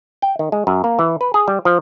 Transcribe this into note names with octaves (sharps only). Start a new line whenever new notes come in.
G5
D#3
G#3
F#2
A#3
E3
B4
G#4
G3
F3